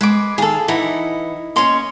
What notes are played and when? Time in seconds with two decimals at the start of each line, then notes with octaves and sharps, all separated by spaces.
0.01 G#3 B4 D6
0.38 D#3 G#4 A4 F5
0.68 E3 D#4 E4 F#5
1.56 A#3 C#4 D#5 C6